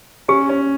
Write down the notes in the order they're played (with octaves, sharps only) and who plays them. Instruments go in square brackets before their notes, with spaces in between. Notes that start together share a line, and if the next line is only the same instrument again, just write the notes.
[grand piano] C#4 [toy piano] G4
[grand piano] C#4